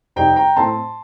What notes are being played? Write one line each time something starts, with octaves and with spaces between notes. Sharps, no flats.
F2 C3 G3 C4 D#4 G5 A#5
G5 A#5
A2 A3 C4 A5 C6